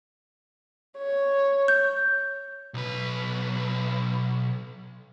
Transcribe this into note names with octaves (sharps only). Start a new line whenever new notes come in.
C#5
G6
B1 B4